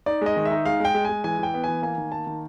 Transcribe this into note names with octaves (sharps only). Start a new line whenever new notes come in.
D#4 D5
G#3 D#5
D#3
D#4 E5
G#3 F5
G#3 G5
G#3
G#3 G#5
E3 G#5
E3 G5
B3
E3 G#5
A#3 G#5
D#3
A#3 A5
D#3